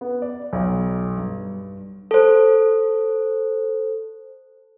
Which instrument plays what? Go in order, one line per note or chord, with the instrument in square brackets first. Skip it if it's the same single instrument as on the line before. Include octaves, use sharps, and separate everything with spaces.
[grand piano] B3
D5
B1
G2
[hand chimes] A4 C5